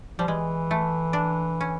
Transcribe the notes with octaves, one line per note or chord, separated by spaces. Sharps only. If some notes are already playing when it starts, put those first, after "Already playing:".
F3 G3
E3 G#3
A3
D4
C#4